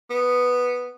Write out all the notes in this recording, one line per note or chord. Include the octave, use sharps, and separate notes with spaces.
B3